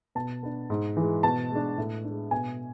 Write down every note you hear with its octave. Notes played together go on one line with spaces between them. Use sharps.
B2 A5
B3 D4
G#2
E3 G#3
B2 A5
G#3
D4
A2
G#3 D4
B2 G#5